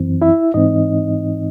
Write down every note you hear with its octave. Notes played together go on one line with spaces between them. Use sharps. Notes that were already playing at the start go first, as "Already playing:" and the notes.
Already playing: F#2 E3 C4
E4 E5
G#2 E3 C4 D#4 D#5